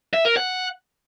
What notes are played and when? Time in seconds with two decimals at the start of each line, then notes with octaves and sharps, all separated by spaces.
0.13 E5
0.25 A#4
0.37 F#5